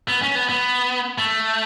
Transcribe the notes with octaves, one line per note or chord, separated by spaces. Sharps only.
B3
C#4
B3
B3
A3